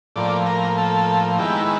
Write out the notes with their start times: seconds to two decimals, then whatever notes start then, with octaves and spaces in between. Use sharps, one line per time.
0.16 A2 F3 A#3 D5
0.46 A#4
0.78 A4
1.39 D#3 G#3 B3 E4 G4